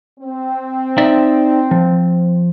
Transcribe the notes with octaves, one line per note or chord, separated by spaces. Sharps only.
C4
D#4 D5 E5
F3